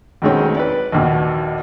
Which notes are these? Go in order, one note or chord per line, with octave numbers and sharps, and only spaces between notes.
F2 B2 D#3 G#3 C4 C#4
B4 D5
A#1 D#2 B2